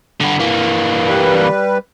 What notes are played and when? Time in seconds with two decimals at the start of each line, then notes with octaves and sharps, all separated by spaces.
0.21 D3 B3
0.40 E3 A#3
1.06 G3 B4